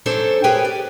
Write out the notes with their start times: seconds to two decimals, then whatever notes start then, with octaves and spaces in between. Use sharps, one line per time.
0.06 F#2 D4 A4 C5 C#5
0.44 G4 G#4 A#4 B4 C#5 G5
0.65 D5